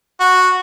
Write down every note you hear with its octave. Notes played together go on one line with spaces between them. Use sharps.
F#4